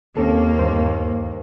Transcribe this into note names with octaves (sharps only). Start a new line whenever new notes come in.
D#2 A#3 C4 C#4 A4
D2 G2 C5